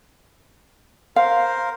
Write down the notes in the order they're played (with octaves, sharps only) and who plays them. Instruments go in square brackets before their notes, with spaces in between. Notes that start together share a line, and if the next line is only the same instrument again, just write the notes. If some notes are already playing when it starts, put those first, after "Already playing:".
[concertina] A#4 C5 [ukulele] F5